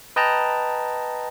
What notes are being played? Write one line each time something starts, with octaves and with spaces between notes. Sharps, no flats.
B4 D#5 G5 A5 A#5